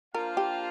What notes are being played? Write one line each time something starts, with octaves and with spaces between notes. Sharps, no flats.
A#3 D4 F4 A#4 C5 F5
G4